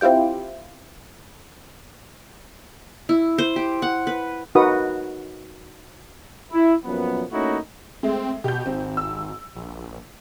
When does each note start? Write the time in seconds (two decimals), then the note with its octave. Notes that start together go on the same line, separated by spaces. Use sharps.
0.01 C4 E4 F4 G4 G5
3.09 E4
3.38 C5
3.56 G4
3.82 F#5
4.07 B4
4.55 D#4 F#4 A#4 B4 F#5 D#6
6.52 E4
6.84 F#2 A#2 F3 B3
7.31 A3 A#3 C#4 D#4 E4 F#4
8.03 G#3 A3 C4
8.44 B2 G4 G6
8.66 G#1 C4
8.97 E6
9.55 A#1